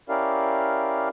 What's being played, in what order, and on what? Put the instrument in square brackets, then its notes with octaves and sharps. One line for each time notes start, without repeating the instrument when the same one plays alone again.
[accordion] C#4 E4 G4 A#4 D5 F5